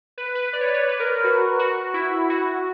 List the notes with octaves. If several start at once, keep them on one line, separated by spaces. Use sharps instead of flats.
B4
B4
D5
C#5
B4
C#5
B4
A#4
F#4
F#4
E4
F#4